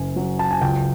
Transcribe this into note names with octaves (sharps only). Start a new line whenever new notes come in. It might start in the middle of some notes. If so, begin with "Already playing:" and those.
Already playing: F#1 G#5
F#3
A5
G#5
C#2 G5